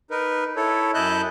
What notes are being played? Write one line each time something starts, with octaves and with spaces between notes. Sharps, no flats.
D#4 A#4 B4
E4 A4 C#5
F#2 E4 D#5 A5 F#6 G6